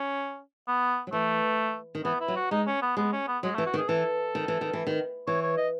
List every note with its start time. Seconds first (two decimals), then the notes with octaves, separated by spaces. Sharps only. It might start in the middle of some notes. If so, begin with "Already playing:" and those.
Already playing: C#4
0.68 B3
1.07 F#3
1.13 E3 A3
1.95 D#3
2.05 E3 B3
2.21 E4
2.28 F#3
2.36 F#4
2.51 G#3 D#4
2.67 C#4
2.82 B3
2.97 G#3 B3
3.13 C#4
3.28 B3
3.43 F#3 G#3
3.55 A3
3.58 E3
3.66 F#4
3.74 D#3
3.78 G#4
3.88 E3 A4
4.35 D#3
4.48 E3
4.61 D#3
4.73 E3
4.87 D#3
5.27 E3 C#5
5.43 C#5
5.57 D#5